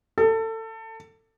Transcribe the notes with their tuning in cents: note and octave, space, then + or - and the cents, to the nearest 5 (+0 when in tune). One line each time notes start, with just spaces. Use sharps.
A4 +25